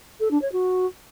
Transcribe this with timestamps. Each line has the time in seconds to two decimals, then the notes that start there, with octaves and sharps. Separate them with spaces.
0.20 A4
0.31 D4
0.41 C#5
0.52 F#4